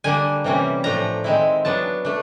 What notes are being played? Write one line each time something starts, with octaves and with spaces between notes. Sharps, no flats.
D3 G3 A#3 D4 G#5
C3 E3 G3 A#3 C#4
A2 F3 A3 D4 A#5
D#3 G#3 C4 E4
F#3 B3 D4 A5
A3 D4